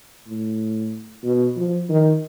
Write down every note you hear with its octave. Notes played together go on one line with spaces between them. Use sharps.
A2
B2
F3
D#3